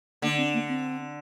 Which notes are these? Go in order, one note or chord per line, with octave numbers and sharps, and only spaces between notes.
D3 A#3
C4
A#3
C4